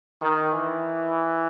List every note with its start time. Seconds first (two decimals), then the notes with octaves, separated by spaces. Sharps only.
0.22 D#3
0.52 E3